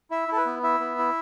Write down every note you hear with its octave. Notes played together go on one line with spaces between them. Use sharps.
E4 E5
E4 A4
B4
B3
E4 E5
B3
E4